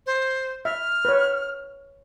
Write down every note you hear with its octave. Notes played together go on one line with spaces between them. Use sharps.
C5
E5 F6
B4 C#5